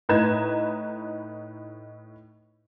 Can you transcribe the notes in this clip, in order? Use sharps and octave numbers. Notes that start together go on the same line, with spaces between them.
A2 D#4 B4 A#5 G#6 E7